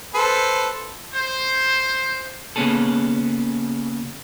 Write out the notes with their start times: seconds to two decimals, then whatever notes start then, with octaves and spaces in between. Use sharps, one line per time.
0.14 A4 B4 C5
1.13 C5
2.56 C#3 A#3 B3 C#4 G#4 A4